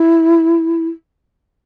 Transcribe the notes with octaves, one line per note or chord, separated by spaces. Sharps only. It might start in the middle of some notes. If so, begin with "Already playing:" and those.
Already playing: E4